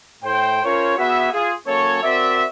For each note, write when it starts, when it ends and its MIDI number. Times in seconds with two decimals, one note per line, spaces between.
0.24 0.64 45
0.24 0.64 72
0.24 0.64 79
0.64 0.97 61
0.64 0.97 65
0.64 0.97 70
0.64 0.97 72
0.64 0.97 73
0.98 1.29 59
0.98 1.29 66
0.98 1.29 68
0.98 1.29 76
1.33 1.54 65
1.33 1.54 68
1.67 2.01 54
1.67 2.01 58
1.67 2.01 61
1.67 2.01 69
1.67 2.01 73
2.03 2.45 60
2.03 2.45 66
2.03 2.45 70
2.03 2.45 74
2.03 2.45 76